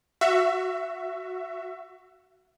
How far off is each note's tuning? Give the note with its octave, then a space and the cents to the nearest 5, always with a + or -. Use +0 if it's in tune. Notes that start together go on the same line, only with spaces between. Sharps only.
F#4 +0 E5 +25